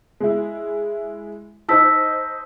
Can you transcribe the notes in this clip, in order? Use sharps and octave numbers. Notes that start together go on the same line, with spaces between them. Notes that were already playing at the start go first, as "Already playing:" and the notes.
G#3 E4
D#4 C5 D#5 A5 E6 B6